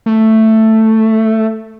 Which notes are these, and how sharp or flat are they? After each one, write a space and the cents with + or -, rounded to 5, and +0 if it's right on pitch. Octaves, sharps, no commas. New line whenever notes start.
A3 +5